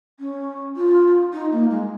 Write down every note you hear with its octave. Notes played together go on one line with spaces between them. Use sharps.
C#4
F4
D#4
A#3
G#3